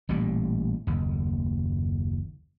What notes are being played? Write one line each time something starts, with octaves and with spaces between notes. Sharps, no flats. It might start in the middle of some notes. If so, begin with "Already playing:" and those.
A1 A#2 G3
F#1 D#2